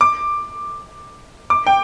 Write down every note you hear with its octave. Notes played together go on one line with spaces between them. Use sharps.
D6
D6
G5